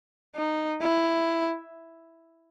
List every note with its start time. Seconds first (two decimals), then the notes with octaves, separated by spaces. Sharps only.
0.36 D#4
0.81 E4